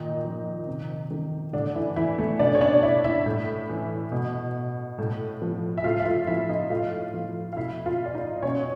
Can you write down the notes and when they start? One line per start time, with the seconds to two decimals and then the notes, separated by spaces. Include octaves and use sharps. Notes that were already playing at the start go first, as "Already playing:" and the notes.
Already playing: A#2 D#3 D#4
0.25 F3
0.67 C3
1.11 D#3
1.53 A2 D3 D4
1.75 E3 E4
1.96 E3 E4
2.18 A3 A4
2.39 B2 D4 D5
2.55 C#5
2.61 D4 D5
2.83 E4 E5
3.04 E4 E5
3.26 A2
3.69 E3
4.12 B2
4.98 A2
5.42 F3
5.77 E5
5.84 A2 F4 F5
6.00 E5
6.06 F4 F5
6.27 F3 E4 E5
6.49 D#4 D#5
6.70 A2 F4 F5
7.14 F3
7.53 F5
7.57 B2 E4 E5
7.86 F4 F5
8.06 D5
8.14 D#4 D#5
8.42 B2 C#4 C#5